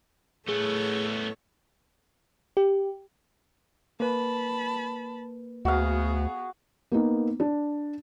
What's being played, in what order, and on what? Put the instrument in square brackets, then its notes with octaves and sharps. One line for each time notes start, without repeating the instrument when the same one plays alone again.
[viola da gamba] A2 A4 C#5 [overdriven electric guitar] A3 B3 [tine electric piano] G#4
[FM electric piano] G4
[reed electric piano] A#3 B4 [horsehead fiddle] A5 B5
[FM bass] D2 [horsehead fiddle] B3 G#4 [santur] F#4 F5
[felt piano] A#3 B3 D#4
D4